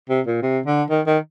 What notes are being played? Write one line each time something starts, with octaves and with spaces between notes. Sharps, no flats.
C3
A#2
C3
D3
D#3
D#3